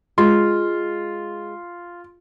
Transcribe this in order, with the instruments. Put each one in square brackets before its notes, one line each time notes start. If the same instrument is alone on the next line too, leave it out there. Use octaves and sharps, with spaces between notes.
[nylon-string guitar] G#3 [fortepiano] F4